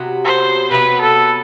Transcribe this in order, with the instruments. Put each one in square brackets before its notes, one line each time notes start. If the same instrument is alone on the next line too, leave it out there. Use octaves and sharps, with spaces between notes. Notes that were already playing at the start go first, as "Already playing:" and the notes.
Already playing: [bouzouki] C3 F#3 B3
[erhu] C5
[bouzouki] C3 F#3 B3 [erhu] B4
[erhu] A4